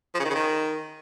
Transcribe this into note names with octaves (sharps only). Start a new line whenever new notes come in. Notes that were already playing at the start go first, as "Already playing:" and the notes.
F3
C#3
D#3
C#3
D#3